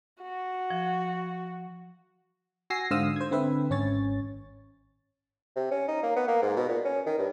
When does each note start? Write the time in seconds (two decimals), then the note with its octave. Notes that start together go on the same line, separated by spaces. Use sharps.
0.22 F#4
0.70 F3
2.70 F#4 G#5 E6 A#6 C7
2.91 G#2 D3 C5 F5 D#6 E6
3.16 C5 G#6
3.31 D3 C4 B4 E5
3.70 G#1 C#4 C#5 A6
5.56 C3
5.71 C#4
5.88 D#4
6.03 A#3
6.16 B3
6.28 A#3
6.42 G#2
6.57 B2
6.69 A#2
6.85 C#4
7.06 D#3
7.19 G2